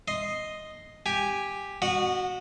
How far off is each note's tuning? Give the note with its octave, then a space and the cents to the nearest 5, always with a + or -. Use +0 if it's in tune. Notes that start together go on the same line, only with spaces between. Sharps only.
D#5 +0 C6 +0
G4 +5 G#5 -10
F#4 +0 D#5 -25 F#5 -30